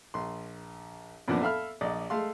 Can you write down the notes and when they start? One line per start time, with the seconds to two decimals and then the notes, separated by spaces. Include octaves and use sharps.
0.14 A#1 C6
1.28 F#2 A#2 F3 A#3 B3 D4
1.42 A4 E5 F5 B5 F6
1.81 A#1 D5 D#5
2.10 G#3 A3 A4 F5 C6